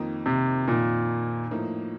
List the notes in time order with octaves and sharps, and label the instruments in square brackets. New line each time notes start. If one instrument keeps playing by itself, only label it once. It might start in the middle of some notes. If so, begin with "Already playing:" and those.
Already playing: [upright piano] F2 D#3 A#3 D#4
[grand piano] C3
[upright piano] F2 D#3 A#3 D#4 [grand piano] A#2
[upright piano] A2 F3 A#3 D#4